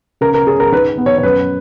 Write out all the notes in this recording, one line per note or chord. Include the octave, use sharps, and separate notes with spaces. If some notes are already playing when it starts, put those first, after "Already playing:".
C#3 A#4
A#4
C#4 G#4
A#4
D#4 B4
B3
C#5
C#5
F#2 B4